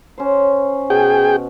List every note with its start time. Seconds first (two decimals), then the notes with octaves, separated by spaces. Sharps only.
0.18 C#4 C5
0.90 B2 G#4 G5